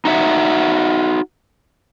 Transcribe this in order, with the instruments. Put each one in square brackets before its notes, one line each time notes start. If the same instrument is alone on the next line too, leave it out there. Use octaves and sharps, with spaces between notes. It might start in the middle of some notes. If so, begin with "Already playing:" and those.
[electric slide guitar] D#4 F#4 E5 F#5